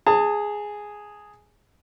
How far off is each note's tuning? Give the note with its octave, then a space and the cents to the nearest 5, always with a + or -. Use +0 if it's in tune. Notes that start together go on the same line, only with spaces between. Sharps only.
G#4 +0 A5 +30